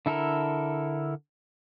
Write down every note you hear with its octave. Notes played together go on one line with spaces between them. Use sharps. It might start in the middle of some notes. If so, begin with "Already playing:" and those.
D3 E4 A4 A#4